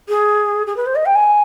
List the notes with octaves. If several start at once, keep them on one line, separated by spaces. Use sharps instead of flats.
G#4
G#4
B4
C5
D#5
G5
G#5